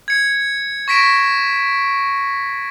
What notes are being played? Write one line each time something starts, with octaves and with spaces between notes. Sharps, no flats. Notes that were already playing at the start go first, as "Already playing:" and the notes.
G#6 C#7
C#6 A#6 B6 D7 E7